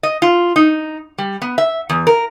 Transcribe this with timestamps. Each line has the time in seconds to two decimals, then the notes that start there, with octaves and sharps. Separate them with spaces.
0.03 D#5
0.22 F4
0.56 D#4
1.18 G3
1.42 B3
1.58 E5
1.89 E2
2.07 A#4